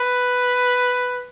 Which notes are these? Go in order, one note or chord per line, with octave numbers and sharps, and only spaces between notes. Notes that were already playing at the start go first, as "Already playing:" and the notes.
Already playing: B4